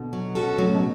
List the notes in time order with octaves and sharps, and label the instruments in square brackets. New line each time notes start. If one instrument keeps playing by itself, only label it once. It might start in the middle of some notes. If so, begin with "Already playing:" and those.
Already playing: [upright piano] B2 D3
[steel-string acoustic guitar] F#3
C#4 F#4 A4
[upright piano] A2 C#3 [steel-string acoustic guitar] F#3
[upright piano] B2